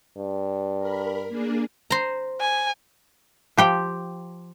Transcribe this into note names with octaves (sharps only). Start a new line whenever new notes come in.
G2
A#4 B5
A#3 D4 G#4
C5 A#5
G#5
F3 G4 G5